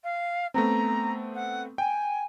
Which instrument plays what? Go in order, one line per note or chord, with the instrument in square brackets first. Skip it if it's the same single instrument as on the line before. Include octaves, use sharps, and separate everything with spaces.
[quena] F5
[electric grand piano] A3 B3 C4 [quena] A#5
[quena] F#5
[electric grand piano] G5 [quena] G#5